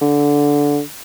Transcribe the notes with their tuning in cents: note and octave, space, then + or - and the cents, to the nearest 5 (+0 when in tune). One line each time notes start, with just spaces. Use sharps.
D3 -15